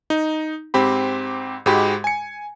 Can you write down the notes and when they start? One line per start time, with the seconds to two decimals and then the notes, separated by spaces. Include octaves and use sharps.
0.10 D#4
0.74 G#2 C4 G4 B5
1.66 G#2 G#3 F#4 G4 B5
2.04 G#5 C#7